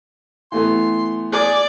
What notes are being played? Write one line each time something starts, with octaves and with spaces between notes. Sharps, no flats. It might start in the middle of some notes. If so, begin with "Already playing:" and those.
E3 A3 B3 C6
G#4 D5